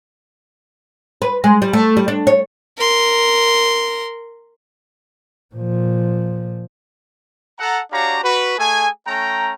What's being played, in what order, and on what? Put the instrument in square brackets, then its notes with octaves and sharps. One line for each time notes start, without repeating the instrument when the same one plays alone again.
[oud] B4
G#3
G3
A3
G3
D4
C#5
[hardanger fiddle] A#4 C6
[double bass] A#2 F3
[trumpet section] A4 F#5 A#5
D4 F#4 G4 C#5 F5 A#5
F#4 B4
A3 G#4 A4 G#5
A3 C#4 G5 A#5